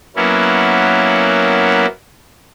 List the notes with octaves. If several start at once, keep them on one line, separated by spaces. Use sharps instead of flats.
F#3 A#3 B3 C#4 E4